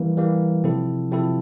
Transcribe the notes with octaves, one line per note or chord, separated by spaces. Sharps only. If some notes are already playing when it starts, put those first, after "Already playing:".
Already playing: E3 G3 A#3
E3 G3 A#3
C3 F3 C4 E4 A4
C3 F3 C4 E4 A4